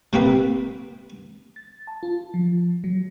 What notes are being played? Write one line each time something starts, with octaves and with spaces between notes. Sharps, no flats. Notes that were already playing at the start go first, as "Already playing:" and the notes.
C3 A#3 C4 B4
A6
A5
F4
F3
F#3